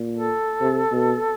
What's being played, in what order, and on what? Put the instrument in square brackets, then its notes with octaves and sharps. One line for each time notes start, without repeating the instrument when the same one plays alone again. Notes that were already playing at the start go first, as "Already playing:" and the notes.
Already playing: [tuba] A#2
[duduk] A4
[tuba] C3
B2